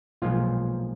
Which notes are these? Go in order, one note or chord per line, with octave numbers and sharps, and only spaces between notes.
B1 A#2 F3 G#3 F4